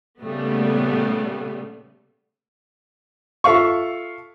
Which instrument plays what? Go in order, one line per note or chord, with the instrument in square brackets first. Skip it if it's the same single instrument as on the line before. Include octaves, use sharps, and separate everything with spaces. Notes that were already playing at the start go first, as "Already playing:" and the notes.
[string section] A#2 C#3 G3 A3 B3
[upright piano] F4 A4 E5 F5 C#6